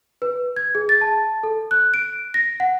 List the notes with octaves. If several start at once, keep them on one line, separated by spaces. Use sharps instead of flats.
B4
G#6
G#4
A6
A5
A4
F#6
D7
A#6
F#5